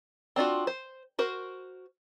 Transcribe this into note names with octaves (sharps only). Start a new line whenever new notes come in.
C4 D4 F4 F#4
C5
F#4 A#4 C5